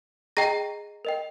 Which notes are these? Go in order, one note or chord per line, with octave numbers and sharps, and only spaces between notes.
G#4 D#5 G5 A#5 A#6
A#4 D#5 G5